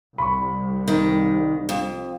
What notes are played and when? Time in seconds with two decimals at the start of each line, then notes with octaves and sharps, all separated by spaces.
0.18 C2 B5 C#6
0.88 D#3
1.69 F2